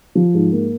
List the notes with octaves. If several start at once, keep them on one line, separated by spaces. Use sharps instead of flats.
F3
G#2
A#3